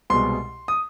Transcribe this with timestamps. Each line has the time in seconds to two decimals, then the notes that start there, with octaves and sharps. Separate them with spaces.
0.10 C2 B2 G#3 C6
0.68 D#6